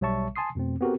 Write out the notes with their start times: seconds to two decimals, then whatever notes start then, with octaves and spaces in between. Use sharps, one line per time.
0.01 B1 G3 C#5 E5 A5 C#6
0.36 G#5 A5 C6 D#6 C7
0.55 F2 B2 A3 C4
0.81 B3 C4 F#4 G4 A4 A#4